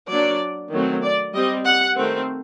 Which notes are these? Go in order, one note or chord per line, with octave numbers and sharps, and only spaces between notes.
F#3 A#3 D4 D5
D#3 F#3 A3 C4
D5
G3 C4 D#5
F#5
D#3 A3 C4